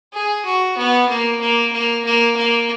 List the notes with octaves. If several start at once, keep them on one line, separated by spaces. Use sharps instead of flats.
G#4
F#4
B3
A#3
A#3
A#3
A#3
A#3